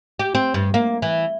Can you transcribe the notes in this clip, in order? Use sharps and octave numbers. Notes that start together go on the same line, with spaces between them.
G4
C4
G2
A#3
E3